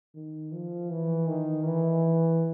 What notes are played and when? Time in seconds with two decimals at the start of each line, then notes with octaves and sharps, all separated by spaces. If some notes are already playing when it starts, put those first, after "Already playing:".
0.15 D#3
0.52 F3
0.90 E3
1.27 D#3
1.64 E3